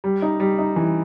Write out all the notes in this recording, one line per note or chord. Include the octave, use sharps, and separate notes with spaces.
G3
D#4
G3
D#4
E3